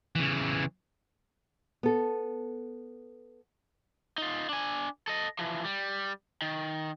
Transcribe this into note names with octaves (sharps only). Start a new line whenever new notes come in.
C#3 E3
B3 A4
D#4 F4
D4 G#5
A4 D#5
E3 F3
G3
D#3